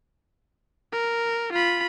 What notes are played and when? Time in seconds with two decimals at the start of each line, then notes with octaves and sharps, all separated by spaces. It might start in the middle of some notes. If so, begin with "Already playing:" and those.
0.92 A#4
1.53 F4 B5